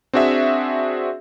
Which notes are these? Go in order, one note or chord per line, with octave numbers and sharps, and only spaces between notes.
C4 D4 F#4 G#4 E5